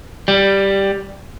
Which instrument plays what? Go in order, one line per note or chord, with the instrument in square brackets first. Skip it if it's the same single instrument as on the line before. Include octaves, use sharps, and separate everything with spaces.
[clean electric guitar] G3